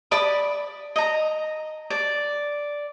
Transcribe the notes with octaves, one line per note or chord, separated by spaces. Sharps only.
D5 B5 D#6
D#5 A#5
D5